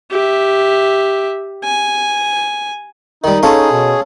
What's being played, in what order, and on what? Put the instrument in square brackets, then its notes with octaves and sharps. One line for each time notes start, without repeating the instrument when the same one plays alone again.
[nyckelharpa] G4 E5
G#5
[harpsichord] D#3 G3 [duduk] D#4
[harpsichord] C#4 F4 C6 [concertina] G#4 [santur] A4 C#5
[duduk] B2